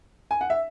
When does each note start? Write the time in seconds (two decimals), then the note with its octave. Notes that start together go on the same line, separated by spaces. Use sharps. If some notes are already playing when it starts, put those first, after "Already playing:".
0.31 G#5
0.41 F#5
0.50 E5